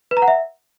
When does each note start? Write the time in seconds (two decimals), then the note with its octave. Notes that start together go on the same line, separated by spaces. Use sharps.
0.11 B4
0.17 A#5
0.22 F#5
0.28 E5